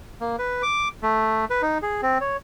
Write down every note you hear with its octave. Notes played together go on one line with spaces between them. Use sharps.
A#3
B4
D6
A3
B4
D#4
G#4
C4
C#5